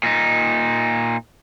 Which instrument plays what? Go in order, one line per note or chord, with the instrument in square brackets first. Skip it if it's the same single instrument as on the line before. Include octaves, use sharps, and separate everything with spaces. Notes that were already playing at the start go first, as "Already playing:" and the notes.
[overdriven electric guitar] A#2 D#4